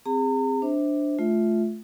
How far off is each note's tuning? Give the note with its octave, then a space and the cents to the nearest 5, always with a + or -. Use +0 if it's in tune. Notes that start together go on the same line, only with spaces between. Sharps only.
C4 +0 G#4 -30 A#5 -40
D4 +0 C5 +0 E5 -30
A3 -20 F4 +0 E5 +0